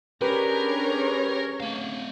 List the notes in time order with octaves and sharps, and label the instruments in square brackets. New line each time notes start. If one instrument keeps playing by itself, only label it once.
[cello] C#4 C#5 [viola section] D4 G#4 A#5 [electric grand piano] G4 B4 [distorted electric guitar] A#4
[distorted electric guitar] A3 F5